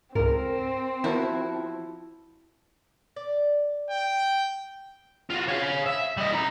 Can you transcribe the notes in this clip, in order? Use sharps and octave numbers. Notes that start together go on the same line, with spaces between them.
C#2 G#2 C4 A#4
F3 B3 E4 F#4 A#4 C5
D5
G5
F4 F#4
C#5 F5
E5
G3 D#5
E4 A#5